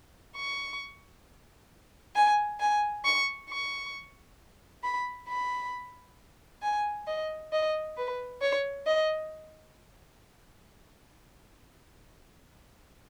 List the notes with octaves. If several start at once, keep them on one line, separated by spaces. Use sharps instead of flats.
C#6
G#5
G#5
C#6
C#6
B5
B5
G#5
D#5
D#5
B4
C#5
D#5